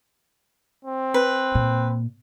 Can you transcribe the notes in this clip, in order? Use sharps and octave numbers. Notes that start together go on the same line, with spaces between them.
C4
B4
A#2